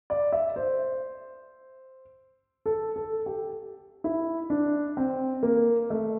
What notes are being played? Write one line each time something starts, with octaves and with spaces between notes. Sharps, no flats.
D5
E5
C5
A4
A4
G4
E4
D4
C4
A#3
A3